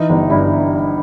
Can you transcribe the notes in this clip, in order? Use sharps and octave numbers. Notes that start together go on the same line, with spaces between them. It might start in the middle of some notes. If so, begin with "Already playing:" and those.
Already playing: E3 D#4
G1
G2 E4